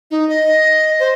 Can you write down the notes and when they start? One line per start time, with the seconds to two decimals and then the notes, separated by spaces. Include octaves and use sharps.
0.11 D#4
0.29 D#5
1.00 C5